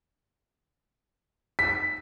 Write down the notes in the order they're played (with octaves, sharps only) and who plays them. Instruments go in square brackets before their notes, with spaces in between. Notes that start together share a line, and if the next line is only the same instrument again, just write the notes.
[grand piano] B6